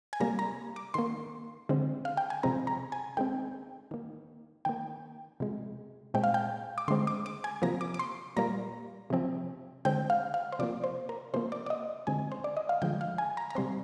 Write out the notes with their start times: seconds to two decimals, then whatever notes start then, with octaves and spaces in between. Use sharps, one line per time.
0.13 G#5
0.20 C3 G3 A#3 A#5
0.39 A#5
0.76 D6
0.94 D#3 A#3 C6
1.69 D3 G#3 C4
2.05 F5
2.17 G5
2.30 G#5
2.43 C3 F3 G#3 C4 A#5
2.67 A#5
2.92 G#5
3.17 D#3 G#3 C4 G5
3.91 D#3 A#3
4.65 D#3 A#3 G5
5.40 C3 F3 G#3
6.14 A#2 G#3 C4 G5
6.24 F5
6.34 G5
6.78 D6
6.88 D3 G#3 C4 C6
7.07 D6
7.26 D6
7.44 G#5
7.62 C3 F3 A#3 A#5
7.81 D6
7.94 D6
7.99 C6
8.37 A#2 G3 A#3 A#5
9.10 C3 F3 C4
9.85 D3 G#3 C4 G5
10.10 F5
10.34 F5
10.52 C5
10.59 C3 F3 A#3 D5
10.84 C5
11.09 A#4
11.34 C3 F3 A#3 C5
11.52 D5
11.66 D5
11.70 D#5
12.07 D3 G#3 C4 G#5
12.32 C5
12.44 D5
12.57 D#5
12.69 F5
12.82 D3 F3 G#3 G5
13.01 F5
13.18 G#5
13.37 A#5
13.50 A#5
13.55 C3 G3 C4 C6